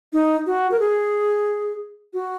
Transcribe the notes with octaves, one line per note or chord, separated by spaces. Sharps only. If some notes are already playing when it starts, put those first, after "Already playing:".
D#4
F#4
A#4
G#4
F#4